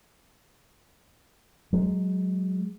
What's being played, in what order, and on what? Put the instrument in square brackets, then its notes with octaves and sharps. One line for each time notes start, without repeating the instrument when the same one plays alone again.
[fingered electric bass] F#3 G#3